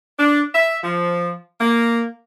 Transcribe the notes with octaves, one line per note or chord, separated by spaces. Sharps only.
D4
E5
F3
A#3